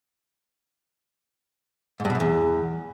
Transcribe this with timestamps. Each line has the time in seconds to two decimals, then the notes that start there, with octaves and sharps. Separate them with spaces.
2.00 G#2
2.05 G2
2.10 B2
2.15 F#2
2.20 E2